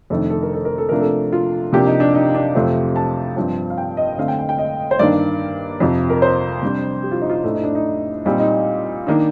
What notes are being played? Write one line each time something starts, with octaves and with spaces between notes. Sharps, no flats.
F2 C3 D#3 A3 D4 A4
A4
A#4
A4
A#4
A4
C3 F3 A3 D4 A#4
A4
F4
C3 F3 A#3 D4 G4
D#4
D4
D#4
D4
F2 C3 F3 A3 C4
A5
G2 F3 C4 A5
F5
G5
D#5
D3 A3 C4 F5
G5
G5
G5
D#5
C5
G2 D#3 A#3 D4 D5
F2 C3 F3
A#4
C5
C3 G3 D4
G4
F4
D#4
F4
A2 A3 D4 D#4
D#4
D4
D#4
A#2 G3 C4 D#4
D#4
D#3 A#3 D4